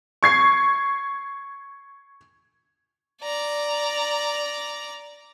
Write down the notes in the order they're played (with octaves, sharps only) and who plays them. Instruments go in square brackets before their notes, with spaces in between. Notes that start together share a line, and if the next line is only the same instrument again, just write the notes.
[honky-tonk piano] C#6 G#6 C7
[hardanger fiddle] D5 A#5